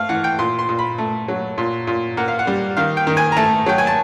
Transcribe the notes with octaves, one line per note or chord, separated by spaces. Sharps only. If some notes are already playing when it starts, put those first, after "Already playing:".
Already playing: A3 F5
E3 F#5
G5
A#2 C6
C6
A#2
B5
A3
F#3
A#2
A#2
A#3 F#5
F5
F#5
G3
D#3 F5
G5
D#3
G#5
A#5
A3 A5
F#3 G5
G#5
A5